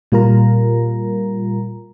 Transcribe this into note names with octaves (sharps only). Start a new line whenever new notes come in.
A#2 G3 F4 A#4 A#5